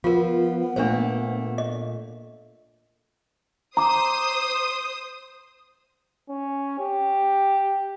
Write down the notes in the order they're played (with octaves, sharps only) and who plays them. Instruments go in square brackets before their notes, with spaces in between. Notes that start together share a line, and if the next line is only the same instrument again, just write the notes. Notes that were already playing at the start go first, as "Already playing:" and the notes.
[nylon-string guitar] F3 [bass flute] B3 [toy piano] F4 A#4
[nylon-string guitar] A#2 A3 A#3 [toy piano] D4 C5
[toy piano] D#5
[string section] C5 D#6 [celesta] A#5 D6
[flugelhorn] C#4
G4